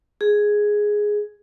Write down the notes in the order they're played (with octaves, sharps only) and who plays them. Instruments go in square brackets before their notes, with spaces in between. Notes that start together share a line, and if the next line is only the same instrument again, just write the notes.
[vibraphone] G#4